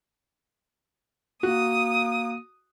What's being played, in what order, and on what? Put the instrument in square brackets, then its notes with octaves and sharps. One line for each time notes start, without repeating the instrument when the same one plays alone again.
[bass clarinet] A#3 [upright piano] F#4 [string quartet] D#6